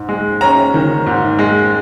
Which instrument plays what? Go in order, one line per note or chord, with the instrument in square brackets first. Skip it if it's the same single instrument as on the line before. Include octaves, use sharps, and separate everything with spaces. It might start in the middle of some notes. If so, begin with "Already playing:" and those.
Already playing: [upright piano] G#2
G#3
C#4 A#5
D#3
G#2
G#3